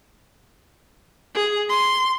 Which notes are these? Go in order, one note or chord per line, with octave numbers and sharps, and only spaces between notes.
G#4
C6